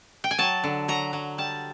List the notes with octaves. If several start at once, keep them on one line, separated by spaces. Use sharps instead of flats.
G5
G#5
F#3 A5
D3
F#3 A#5
F#3
G3 A5